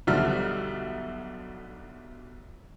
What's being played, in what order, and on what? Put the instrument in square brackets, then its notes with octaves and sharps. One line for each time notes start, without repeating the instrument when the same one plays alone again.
[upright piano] B1 D3 F3 G3 E5 F6